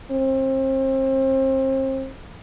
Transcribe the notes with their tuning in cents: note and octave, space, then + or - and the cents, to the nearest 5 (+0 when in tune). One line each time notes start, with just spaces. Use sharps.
C4 +35